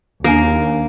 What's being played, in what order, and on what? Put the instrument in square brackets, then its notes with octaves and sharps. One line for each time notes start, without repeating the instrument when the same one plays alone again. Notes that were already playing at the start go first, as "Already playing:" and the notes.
[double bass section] D#2 [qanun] A#3 [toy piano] C#4 D4